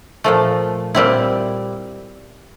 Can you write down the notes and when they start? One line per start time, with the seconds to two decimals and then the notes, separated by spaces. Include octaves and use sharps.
0.24 A#2 F3 A3
0.95 A#2 G3 C4 E4